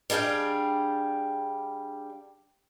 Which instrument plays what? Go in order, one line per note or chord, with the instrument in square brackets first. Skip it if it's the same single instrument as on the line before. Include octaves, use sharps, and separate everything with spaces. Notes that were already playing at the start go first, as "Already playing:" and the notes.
[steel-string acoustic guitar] G3 D4 G#4 F5 G5